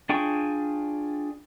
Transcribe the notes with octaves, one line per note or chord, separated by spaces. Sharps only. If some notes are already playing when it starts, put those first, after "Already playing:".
D4 F4 G#4 G5 C#6